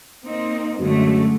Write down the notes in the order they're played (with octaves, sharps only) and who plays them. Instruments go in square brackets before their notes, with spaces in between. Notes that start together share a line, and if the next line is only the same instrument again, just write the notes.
[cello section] A#3 C4 D#4
[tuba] F#2 [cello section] D3 G#3 A3